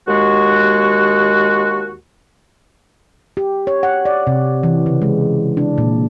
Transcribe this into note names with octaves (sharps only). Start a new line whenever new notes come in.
D#2 G#3 F#4
G4
C#5
F#5
D5
C3
E3
C#3
G#3
D4
A#2